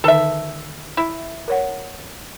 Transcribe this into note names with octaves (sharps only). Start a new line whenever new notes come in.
D3 D#3 D#4 A4 E5
E4
A#4 C#5 F#5